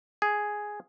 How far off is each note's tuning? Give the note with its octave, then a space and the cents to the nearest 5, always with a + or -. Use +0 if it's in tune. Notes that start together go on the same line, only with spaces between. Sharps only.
G#4 +0